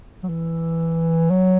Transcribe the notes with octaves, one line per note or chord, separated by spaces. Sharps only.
F#3
E3
F#3